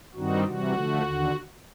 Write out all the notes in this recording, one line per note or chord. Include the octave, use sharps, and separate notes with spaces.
G2 D#3 G3 C4 D#4 F#4
C3 E3 G3 F#4
D3 F3 A3
D#2 D3